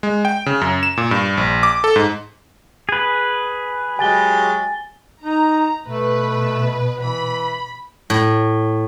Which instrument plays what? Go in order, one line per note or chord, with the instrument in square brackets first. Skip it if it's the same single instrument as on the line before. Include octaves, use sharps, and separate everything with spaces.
[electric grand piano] G#3
G5
C#3
F#2
E7
A#2
G2
A#1
D6
A4
G#2
[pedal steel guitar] G#4 B4
[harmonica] F#3 G#3 G4 [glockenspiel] G#5 A6 G7
[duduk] D#4 [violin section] A#5
[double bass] B2 [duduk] A3 [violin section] B4
[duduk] E3 [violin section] B5
[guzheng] A2